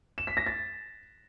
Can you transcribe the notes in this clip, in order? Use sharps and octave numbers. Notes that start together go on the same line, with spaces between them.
E7
B6
A#6
A6